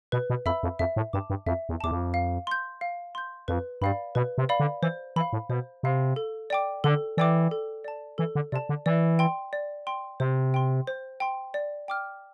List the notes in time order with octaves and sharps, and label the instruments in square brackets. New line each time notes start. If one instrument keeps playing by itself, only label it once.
[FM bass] B2 [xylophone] B4
[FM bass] B2
[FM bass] F2 [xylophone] E5 B5 E6
[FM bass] F2
[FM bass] F2 [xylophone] E5
[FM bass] A2
[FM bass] G2 [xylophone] A5 D6
[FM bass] G2
[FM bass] F2 [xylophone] E5
[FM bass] E2
[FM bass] E2 [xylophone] A5 D6
[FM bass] F2
[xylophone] F5
C6 G6
F5
C6 G6
[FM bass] F2 [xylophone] B4
[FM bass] G2 [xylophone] D5 F5 B5
[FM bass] B2 [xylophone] B4
[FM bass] C3
[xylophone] D5 F5 B5
[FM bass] D3
[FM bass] E3 [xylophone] C5
[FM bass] E3 [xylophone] F5 B5
[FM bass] A2
[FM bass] B2 [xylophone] C5
[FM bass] C3 [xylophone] F5 B5
[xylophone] A4
D5 G5 D6
[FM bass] D3 [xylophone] A4
[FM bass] E3 [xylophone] D5 G5 D6
[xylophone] A4
D5 A5
[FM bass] E3 [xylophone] A4
[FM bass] D3
[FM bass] C3 [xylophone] D5
[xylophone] A5
[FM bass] D3
[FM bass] E3 [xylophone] D5
[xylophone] G5 C6
D5
G5 C6
[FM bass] C3 [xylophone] C5
[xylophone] G5 C6
C5
G5 C6
D5
G5 D6 F6